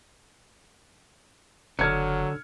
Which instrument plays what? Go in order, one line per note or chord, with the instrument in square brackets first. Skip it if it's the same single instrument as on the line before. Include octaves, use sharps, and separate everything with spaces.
[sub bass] F#1 [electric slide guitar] D3 [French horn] F#3 [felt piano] F6 G#6 C#7